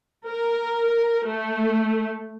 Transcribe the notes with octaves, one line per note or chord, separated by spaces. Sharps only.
A#4
A3